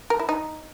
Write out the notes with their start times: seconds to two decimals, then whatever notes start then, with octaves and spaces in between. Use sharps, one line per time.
0.10 A#4
0.19 E4
0.29 D#4